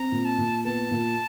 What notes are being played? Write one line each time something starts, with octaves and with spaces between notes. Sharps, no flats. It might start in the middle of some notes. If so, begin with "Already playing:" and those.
Already playing: C4 A#5
A#2
A5
A#2
B3 A5
A#2